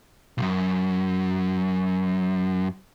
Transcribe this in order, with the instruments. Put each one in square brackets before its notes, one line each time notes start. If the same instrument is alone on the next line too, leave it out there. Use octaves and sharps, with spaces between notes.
[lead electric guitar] B1 F#2